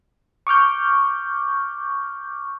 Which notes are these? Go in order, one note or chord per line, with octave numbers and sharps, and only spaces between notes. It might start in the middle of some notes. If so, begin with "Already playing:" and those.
C#6 D6 F6 G6